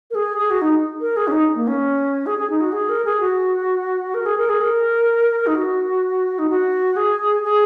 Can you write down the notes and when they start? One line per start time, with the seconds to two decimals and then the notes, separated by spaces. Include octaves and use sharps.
0.11 A#4
0.15 G#4
0.38 G#4
0.50 F#4
0.61 D#4
1.01 A#4
1.16 G#4
1.28 C#4
1.32 D#4
1.56 A#3
1.67 C#4
2.26 G#4
2.38 G#4
2.50 D#4
2.61 F#4
2.73 G#4
2.89 A#4
3.05 G#4
3.20 F#4
4.14 A#4
4.26 G#4
4.38 A#4
4.49 G#4
4.61 A#4
5.47 D#4
5.55 F#4
6.39 D#4
6.49 F#4
6.96 G#4
7.43 G#4